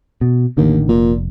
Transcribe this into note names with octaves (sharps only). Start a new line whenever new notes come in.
B2
A1 D#2 D3 D#3
F1 A#2